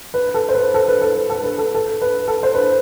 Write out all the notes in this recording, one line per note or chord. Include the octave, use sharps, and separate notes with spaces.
B4
A4
C5
B4
A4
B4
A4
B4
A4
B4
A4
A4
B4
A4
C5
B4